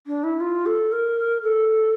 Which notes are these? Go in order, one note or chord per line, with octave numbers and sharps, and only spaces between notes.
D4
E4
F4
A4
A#4
A4